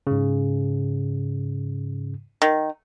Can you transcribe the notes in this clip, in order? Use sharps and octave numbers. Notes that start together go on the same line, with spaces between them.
G#2 C#3
D#3